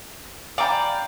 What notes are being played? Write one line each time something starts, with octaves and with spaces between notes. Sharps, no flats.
D5 F5 G5 G#5 A#5 B5